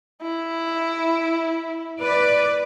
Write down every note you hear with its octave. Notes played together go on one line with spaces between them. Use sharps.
E4
B4 D5